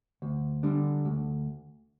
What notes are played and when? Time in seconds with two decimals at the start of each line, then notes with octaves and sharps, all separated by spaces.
0.22 D2
0.63 D3 G3 D4
1.05 D2